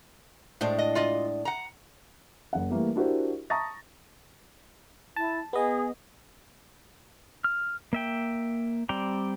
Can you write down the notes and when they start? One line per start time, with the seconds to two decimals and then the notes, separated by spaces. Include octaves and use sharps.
0.61 A2 G#3 D4 C5
0.79 D#5
0.95 F4 D5 D#5
1.45 F#5 A#5
2.53 F#1 F#5
2.70 E3 G3 A3 A#3
2.95 D4 E4 F#4 G4 A#4 C5
3.50 A5 A#5 C#6 D#6 A6 A#6
5.16 E4 A5
5.53 B3 G#4 D#5
7.44 F6
7.93 A#3 E5 G5
8.89 G3 C4 D5 G5 A#5